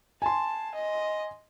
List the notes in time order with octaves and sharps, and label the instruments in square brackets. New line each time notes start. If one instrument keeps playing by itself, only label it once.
[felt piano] G#5 C6 [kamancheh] A5
[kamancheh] D#5